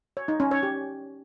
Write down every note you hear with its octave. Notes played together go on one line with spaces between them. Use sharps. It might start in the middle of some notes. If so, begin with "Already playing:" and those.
C#5
D#4
C#4
C#5
G4